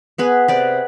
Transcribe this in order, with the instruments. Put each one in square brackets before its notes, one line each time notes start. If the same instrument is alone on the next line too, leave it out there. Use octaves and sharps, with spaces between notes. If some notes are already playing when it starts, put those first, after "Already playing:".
[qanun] B3 G#4 B4
C3 B4 D5